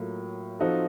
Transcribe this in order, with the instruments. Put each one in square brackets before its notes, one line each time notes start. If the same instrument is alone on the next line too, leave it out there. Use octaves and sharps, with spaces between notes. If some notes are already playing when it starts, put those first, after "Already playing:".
Already playing: [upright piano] A2 F#3 A#3 F4
F3 C4 D#4 F#4 A4